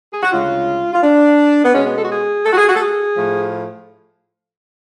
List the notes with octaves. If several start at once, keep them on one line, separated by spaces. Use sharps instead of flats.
G#4
F#4
D2 C#3 G#3 F4
F4
D4
B3
B2 G#3 C#4
B3
A4
F#4
G#4
A4
F#4
G#4
F#4
A4
G#4
A2 F3 A3